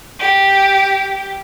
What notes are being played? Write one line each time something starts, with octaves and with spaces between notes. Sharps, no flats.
G4